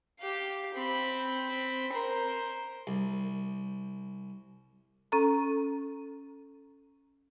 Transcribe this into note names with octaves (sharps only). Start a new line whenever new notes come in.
G4 F5
C4 B5
A#4 C5
C2
C#4 A4 A#5